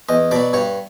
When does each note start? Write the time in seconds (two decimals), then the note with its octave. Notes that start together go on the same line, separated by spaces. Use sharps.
0.09 E2 D#5
0.31 B2 F#3 D5
0.53 G2 C#5